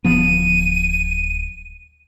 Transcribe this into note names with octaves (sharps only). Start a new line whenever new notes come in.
D1 F3 B3 D#7